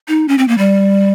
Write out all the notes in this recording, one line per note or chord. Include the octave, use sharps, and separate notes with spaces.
D#4
C#4
C4
A#3
G3